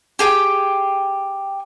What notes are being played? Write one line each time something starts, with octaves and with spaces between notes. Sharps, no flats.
G4 G#4 G5